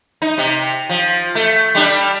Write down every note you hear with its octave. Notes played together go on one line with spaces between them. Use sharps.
D#4
C3
F3
A3
G3 D4